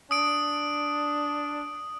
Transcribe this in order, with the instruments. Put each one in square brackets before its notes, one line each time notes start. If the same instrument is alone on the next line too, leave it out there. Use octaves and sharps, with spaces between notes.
[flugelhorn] D4 [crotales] D#6 D7